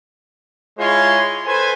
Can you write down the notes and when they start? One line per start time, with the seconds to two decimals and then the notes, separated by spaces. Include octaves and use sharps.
0.78 G#3 E4 F4 G#4 C#5 C6
1.45 A4 B4 C5 G#5